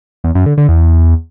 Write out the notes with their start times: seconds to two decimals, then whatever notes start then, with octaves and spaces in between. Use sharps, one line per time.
0.24 E2
0.35 F#2
0.46 D3
0.57 D3
0.69 E2